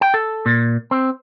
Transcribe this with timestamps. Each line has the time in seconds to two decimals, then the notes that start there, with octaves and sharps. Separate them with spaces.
0.01 G5
0.14 A4
0.46 A#2
0.91 C4